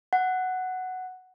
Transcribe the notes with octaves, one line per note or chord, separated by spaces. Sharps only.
F#5